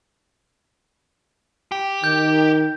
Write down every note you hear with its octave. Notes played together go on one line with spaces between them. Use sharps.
G4
D#3 G6